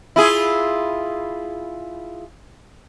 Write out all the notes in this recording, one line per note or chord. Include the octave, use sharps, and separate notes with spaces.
E4 F4 G#4